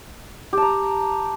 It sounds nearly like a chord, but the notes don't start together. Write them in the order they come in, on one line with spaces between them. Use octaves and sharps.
G4 A5 A#5